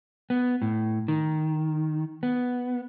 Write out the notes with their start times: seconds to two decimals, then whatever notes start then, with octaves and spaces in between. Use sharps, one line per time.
0.30 B3
0.62 A2
1.08 D#3
2.23 B3